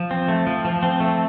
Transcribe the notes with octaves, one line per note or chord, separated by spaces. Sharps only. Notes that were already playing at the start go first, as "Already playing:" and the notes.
Already playing: F3
C4
A3
F3
F3
C4
A3